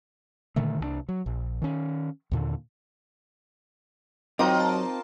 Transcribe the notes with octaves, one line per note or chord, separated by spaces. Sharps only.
A#2 D3 D#3 A3
C2 F#3 D4
F#3
A#1
D#3 C#4
D#2 A#2 D3
F#3 C4 D#4 F4 A#4 D#5 G5 D6
A5